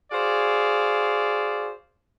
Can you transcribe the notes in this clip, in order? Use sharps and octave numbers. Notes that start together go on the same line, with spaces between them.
F#4 G#4 C5 D5 F5